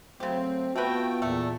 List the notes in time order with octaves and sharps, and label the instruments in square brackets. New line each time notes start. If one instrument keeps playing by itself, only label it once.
[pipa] C#3 G4 [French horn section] F#3 A3 [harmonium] C4
[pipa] A3 B4 [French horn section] B3 F4 [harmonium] F#4 G5
[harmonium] E2 A#2 [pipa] A3 A4